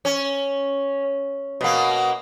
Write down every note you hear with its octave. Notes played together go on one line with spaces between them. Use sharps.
C#4
B2 A#3